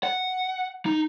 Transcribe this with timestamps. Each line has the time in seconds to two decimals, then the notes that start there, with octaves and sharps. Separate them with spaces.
0.03 F#5
0.86 D#4